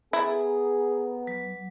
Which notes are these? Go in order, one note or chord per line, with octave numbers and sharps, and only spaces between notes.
B3 E4 G#4 A4 A#5
F#3